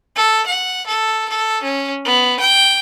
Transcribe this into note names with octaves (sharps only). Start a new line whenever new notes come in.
A4
F#5
A4
A4
C#4
B3
G5